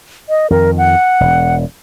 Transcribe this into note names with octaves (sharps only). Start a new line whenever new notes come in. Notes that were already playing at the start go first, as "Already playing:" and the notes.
D#5
F2 D#3 A#4
F#5
E1